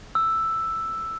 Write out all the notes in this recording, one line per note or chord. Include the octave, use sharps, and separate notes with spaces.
E6